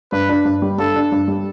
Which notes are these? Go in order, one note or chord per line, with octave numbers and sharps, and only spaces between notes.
G2 B4
D4
G2
G3
G2 A4
D4
G2
G3